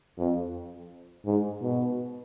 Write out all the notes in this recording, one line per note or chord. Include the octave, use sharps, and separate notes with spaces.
F2
G#2
B2